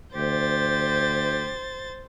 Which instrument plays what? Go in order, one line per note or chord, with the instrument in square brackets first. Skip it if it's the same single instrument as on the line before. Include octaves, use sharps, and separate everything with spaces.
[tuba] D2 [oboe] G4 [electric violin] C5 A6